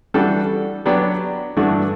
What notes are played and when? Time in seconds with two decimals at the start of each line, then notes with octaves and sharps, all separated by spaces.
0.14 E3 G3 D4 F#4 A4
0.85 F#3 B3 D4 G4 D5
1.57 G2 E3 A3 D4 F#4